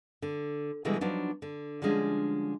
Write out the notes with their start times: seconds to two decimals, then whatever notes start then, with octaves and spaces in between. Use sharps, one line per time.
0.22 D3
0.85 B2 D3 E3 G3 G#3
1.01 F3 F#3 B3 D4 D#4
1.42 D3
1.82 D3 F3 G3 G#3 C#4 D4